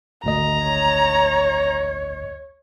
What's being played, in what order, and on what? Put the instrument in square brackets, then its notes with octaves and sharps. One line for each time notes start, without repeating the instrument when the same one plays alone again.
[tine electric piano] G#1 D2 D#5 [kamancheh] A#5
[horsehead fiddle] C#5